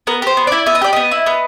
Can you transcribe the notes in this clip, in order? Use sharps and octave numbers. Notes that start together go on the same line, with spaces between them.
B3 A#4
G4 C5
B3
E4 D5
B3 E5
D#5
G4 D5
B3 D#5
E4
B3